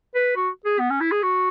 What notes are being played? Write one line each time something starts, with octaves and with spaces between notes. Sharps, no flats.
B4
F#4
G#4
B3
C#4
E4
G#4
F#4